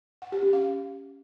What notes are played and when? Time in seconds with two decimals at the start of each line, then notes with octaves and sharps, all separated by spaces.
0.22 F#5
0.32 G4
0.43 C#4
0.53 F5